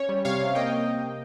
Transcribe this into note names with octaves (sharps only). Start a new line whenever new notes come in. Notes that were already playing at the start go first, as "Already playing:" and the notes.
Already playing: C#4 C#5
G3
C3 C#5 F5
C3
A#3 D#5 G5